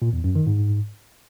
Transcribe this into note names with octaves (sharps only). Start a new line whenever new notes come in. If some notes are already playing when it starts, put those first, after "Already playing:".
A#2
E2
F#2
D#3
G#2